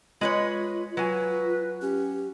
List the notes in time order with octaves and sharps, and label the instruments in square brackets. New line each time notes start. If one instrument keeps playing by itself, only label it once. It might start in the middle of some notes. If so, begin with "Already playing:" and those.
[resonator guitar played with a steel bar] G#3 B4 C#5 [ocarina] F4
[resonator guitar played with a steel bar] F#3 G#5 [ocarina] F4 [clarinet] B4
[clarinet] C#4 [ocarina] G4